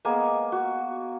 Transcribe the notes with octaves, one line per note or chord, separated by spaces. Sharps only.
G#3 A#3 B3 G#5
F#4